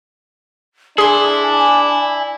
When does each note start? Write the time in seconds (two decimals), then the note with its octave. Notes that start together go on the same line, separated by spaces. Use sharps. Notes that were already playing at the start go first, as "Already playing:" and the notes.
0.98 D4 E4 G#4 G#5 C6